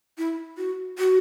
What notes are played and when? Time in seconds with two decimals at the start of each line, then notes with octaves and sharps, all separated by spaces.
0.18 E4
0.58 F#4
0.99 F#4